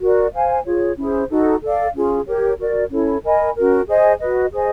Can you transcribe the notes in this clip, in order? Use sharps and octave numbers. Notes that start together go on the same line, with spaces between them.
F#4 A#4 D5
C5 F5 G#5
F4 G#4 C#5
C#4 E4 G#4 C5
D#4 F#4 A4
A4 D5 F5
C#4 F4 G#4
G4 A#4 C#5
F#4 A#4 D5
C#4 E4 A4 C#5
A#4 D#5 G#5 B5
C#4 F#4 A#4
G#4 C5 D#5 G#5
F#4 B4 D#5
G#4 C5 D#5 G#5